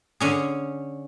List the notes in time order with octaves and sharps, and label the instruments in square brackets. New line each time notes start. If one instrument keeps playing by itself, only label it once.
[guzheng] D3 C#4 G#4